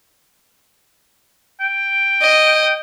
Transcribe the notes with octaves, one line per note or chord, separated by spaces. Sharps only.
G5
D#5